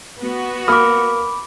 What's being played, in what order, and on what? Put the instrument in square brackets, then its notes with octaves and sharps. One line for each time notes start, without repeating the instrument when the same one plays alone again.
[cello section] B3 F#4
[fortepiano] A#3 D#6 F6 [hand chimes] B5 D6